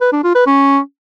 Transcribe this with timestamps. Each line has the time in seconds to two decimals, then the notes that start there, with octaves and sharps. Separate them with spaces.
0.01 B4
0.12 D4
0.24 F4
0.35 B4
0.46 C#4